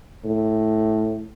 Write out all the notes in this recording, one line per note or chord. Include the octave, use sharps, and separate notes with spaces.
A2